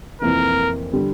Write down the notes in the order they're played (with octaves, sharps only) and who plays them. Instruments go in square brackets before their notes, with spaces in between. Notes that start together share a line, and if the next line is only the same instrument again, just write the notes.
[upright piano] F1 F2 E3 A#3 [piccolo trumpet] A#4
[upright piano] D3 G3